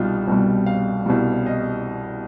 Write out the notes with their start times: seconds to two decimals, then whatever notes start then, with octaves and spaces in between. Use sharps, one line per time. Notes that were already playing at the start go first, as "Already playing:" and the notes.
Already playing: C2 B2 G3 D#4 F4
0.27 C2 B2 G3
0.66 F5
1.06 C2 B2 G3
1.46 D#5